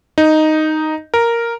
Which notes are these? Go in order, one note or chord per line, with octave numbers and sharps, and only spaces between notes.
D#4
A#4